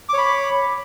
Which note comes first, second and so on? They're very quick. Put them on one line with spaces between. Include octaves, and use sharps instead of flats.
D6 C#5 B5